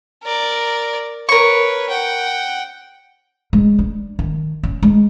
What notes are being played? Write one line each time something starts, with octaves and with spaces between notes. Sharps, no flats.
A#4 D5
A#4 B4 C#5 C#6
F#5 G5
G#3
D4
D#3
C#4
G#3